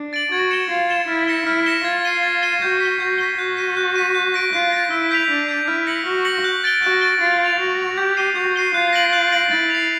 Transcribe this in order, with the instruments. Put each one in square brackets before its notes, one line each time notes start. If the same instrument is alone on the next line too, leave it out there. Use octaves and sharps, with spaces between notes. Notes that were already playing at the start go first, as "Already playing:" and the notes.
Already playing: [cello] D4
[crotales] A6 D7 F#7
[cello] F#4 [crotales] G#6
[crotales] C#7 E7 G7
[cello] F4 [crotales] G#6
[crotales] C#7 E7 G7
[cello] E4 [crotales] F6
[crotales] A#6 C#7 E7 G7
[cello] E4 [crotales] F6
[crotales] A#6 C#7 E7 G7
[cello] F4 [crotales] G#6
[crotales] C7 D#7 G7
G#6
C7 D#7 G7
[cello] F#4 [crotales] G6
[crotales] B6 D#7 G7
[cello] F#4 [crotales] G6
[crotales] B6 D#7 G7
[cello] F#4 [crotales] F#6
[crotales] B6 D#7
F#6
B6 D#7
F#6
A#6 D7
[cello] F4 [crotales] F#6
[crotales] A#6 D7
[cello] E4 [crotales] E6
[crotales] G6 B6 D7 F7
[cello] D4 [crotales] E6
[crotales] G6 B6 D7 F7
[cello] E4 [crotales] F6
[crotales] A#6 C#7 F#7
[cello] F#4 [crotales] F6
[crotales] A#6 C#7 F#7
F#6
A6 D7 G7
[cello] F#4 [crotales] F#6
[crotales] A6 D7 G7
[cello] F4 [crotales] A6
[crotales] D7 F7
[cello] F#4 [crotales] A6
[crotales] D7 F7
[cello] G4 [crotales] G6
[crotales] C7 D#7 G7
[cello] F#4 [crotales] G6
[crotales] C7 D#7 G7
[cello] F4 [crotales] F#6
[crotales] A#6 D7 F#7
F#6
A#6 D7 F#7
[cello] E4 [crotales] A6
[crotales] C7 F7